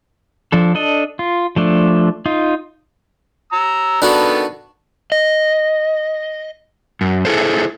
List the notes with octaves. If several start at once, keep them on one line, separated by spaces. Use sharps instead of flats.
F3 D4 A4
D4 A4 D#5
F4
F3 A3 D4
D#4 F4
A#5 E6
D#3 B3 D4 F#4 A4
D#5
F#2
E4 G#4 A4 C5